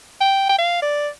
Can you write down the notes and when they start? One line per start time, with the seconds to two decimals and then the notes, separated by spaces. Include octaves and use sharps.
0.21 G5
0.49 G5
0.58 F5
0.82 D5